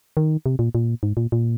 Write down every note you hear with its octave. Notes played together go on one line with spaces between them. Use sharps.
D#3
C3
A#2
A#2
G#2
A#2
A#2